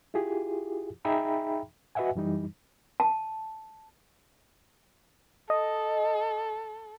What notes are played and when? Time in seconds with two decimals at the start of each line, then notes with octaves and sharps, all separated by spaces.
0.14 E4 F4 G4 G#4
1.05 D#4 G#4 E5 G5 A#5 B5
1.95 F#4 B4 D#5 E5 F#5 G#5
2.15 F#2 E3 G3 D#4
3.00 A5
5.50 A4 D#5